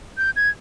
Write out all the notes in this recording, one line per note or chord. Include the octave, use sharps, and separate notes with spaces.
G6
G#6